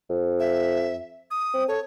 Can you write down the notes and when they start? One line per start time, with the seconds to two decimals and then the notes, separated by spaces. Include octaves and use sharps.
0.10 F2
0.40 E5
1.31 D#6
1.54 C4
1.68 A4 C#5